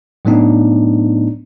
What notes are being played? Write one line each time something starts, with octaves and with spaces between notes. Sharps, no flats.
A2 F#3 A3 B3 D4 D#4